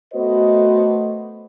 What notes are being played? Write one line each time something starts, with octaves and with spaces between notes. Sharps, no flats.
A3 B3 F#4 B4 C5 D#5